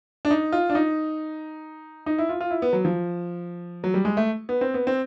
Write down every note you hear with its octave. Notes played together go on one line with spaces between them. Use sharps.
D4
D#4
F4
D4
D#4
D#4
E4
F4
F4
E4
B3
F#3
F3
F#3
G3
G#3
A3
B3
C4
B3
C4